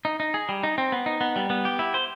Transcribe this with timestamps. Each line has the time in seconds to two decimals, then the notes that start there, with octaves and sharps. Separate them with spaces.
0.05 D#4
0.20 D#4
0.34 G#4
0.49 G3
0.63 D#4
0.78 C4
0.92 B3
1.06 D#4
1.21 B3
1.36 G3
1.50 B3
1.65 G4
1.79 E4
1.94 C5